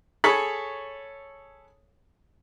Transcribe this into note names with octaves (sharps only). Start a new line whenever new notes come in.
G#4 A4 C#5 B5